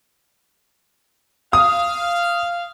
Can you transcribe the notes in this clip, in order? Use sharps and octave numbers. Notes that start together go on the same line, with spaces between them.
F5 D#6